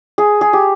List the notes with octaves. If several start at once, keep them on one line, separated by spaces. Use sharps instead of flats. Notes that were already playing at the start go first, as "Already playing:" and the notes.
G#4
G#4
G4